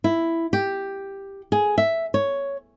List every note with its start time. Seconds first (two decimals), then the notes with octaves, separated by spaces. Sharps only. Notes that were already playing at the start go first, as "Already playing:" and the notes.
0.04 E4
0.53 G4
1.52 G#4
1.78 E5
2.14 C#5